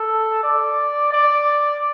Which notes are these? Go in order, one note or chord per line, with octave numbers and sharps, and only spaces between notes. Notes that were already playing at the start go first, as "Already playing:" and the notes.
Already playing: A4
D5
D5